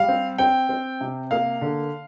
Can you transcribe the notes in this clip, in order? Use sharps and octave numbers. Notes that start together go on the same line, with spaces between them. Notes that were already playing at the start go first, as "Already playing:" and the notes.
Already playing: G3 F5
C4
C4 G5
C4
C3
A#3 F5
D3